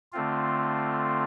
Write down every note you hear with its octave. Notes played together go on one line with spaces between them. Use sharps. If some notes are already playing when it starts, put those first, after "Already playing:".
D3 A3 C4 F4